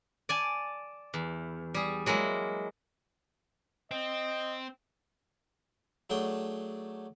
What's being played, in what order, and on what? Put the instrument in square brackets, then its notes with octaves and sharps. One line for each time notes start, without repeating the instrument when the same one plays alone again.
[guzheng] D5 G#5 A5
E2
G3 G#4
F#3 G#3 A#3 E4
[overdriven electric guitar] C4 [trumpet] D#5
[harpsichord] F#3 A3 D4 G#4 G5